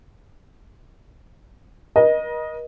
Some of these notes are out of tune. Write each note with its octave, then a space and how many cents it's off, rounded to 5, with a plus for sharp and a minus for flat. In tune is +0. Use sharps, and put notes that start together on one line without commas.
A#4 +45 D#5 +0